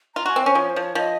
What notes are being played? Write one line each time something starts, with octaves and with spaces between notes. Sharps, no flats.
F4 A#5
F#4 G#5
C4
C#4 C5
F3 C#5
C5
F3
C#5
F3 D#5